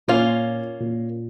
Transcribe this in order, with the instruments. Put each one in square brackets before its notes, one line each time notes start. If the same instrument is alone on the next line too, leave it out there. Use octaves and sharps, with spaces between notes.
[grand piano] A#2 [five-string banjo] A#3 C#4 F4
[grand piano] A#2